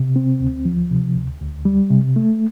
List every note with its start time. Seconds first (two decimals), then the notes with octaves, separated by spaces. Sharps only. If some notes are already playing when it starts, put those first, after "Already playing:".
Already playing: C3
0.16 C4
0.40 D2
0.65 F3
0.91 C3
1.16 D2
1.41 D2
1.65 G3
1.91 C3
2.16 A3